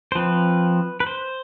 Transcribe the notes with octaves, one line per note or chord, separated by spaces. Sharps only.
C5
F3 C4 B4
B4
C5